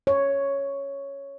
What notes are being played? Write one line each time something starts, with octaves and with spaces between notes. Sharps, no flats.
C#5